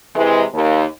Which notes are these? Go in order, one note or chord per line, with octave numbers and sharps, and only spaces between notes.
C3 E3 G#3
D#2